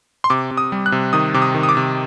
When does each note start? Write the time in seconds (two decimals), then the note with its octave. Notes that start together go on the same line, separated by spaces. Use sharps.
0.24 C6
0.30 C3 D6
0.51 C3
0.57 D#6
0.72 G3
0.86 F#6
0.92 C3
1.13 D#3 D#6
1.34 C3 D6
1.42 D#6
1.55 D#3
1.63 D#6
1.69 D6
1.77 C3